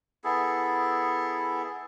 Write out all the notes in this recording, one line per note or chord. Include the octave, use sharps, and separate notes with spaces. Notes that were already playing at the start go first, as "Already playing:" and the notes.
B3 E4 G#4 A4